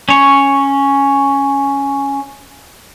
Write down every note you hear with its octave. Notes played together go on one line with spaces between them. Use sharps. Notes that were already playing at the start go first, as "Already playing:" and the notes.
C#4 C#5